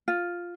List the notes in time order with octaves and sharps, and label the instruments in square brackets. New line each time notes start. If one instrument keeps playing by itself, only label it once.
[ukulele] F4